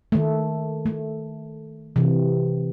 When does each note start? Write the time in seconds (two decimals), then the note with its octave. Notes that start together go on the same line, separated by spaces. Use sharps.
0.12 D#3 A3
0.86 A3
1.96 C3 E3